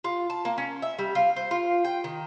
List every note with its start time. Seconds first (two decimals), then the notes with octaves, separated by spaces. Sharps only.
0.04 F4
0.30 A5
0.45 A#3
0.58 C#4
0.82 E5
0.99 G3
1.15 F4
1.36 C5
1.51 F4
1.85 G5
2.04 D#3